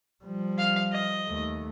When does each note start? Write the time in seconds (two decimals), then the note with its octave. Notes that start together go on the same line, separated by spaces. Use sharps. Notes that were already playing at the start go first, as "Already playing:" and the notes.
0.23 F3 G3
0.58 F5
0.92 D#5
1.26 D#2 A3